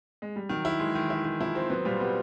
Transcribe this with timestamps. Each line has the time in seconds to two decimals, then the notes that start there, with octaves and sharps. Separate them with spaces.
0.22 G#3
0.36 G3
0.49 D#3 F#3
0.65 E4
0.80 E3 G#3
0.95 D#3
1.10 E3 E4
1.25 D#3
1.40 F3 E4
1.55 C4
1.70 F#3 B3
1.85 A#2 G3
2.00 G3 B3